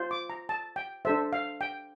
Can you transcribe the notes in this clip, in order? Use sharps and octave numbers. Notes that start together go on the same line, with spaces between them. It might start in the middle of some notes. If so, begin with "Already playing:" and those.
Already playing: F4 C5
D6
A#5
A5
G5
D4 A4 C5 E5
F5
G5